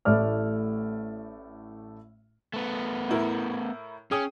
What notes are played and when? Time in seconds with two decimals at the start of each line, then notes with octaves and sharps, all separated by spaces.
0.05 A1 A2 A3 E4 D5 F6
2.54 A3 B3
3.09 A2 E4 A#4
4.11 C#4 G#4 G5 D#6